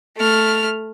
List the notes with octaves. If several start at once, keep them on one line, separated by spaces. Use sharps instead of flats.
A3 F6